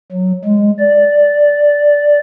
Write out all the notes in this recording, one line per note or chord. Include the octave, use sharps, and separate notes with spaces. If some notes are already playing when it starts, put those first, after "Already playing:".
F#3
G#3
D5